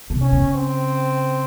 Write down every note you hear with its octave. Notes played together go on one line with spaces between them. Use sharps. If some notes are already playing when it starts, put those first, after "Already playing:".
C3
C#4
C#3
C4